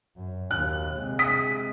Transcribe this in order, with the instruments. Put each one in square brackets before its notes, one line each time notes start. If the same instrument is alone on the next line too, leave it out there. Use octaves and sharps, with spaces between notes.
[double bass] F#2
[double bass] D#2 [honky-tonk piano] F#6
[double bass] C3 G#3
[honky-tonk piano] D#6 B6